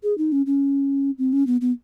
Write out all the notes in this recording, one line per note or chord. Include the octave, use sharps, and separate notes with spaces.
G#4
D#4
C#4
C#4
C4
C#4
B3
B3